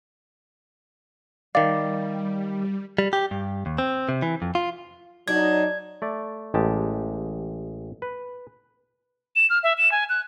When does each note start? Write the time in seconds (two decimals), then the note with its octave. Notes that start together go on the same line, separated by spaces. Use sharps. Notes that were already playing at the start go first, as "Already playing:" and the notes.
1.55 D#3 G3 D5 F5
2.98 G3
3.13 G4
3.31 G2
3.66 D#2
3.78 C4
4.09 C3
4.22 E3
4.42 F2
4.55 F4
5.28 F#3 D4 D#4 G#6
6.02 A3 D5
6.54 A1 G#3 G4 A5
8.02 B4
9.36 E7
9.50 F6
9.63 E5
9.78 E7
9.92 G#5
10.09 F#6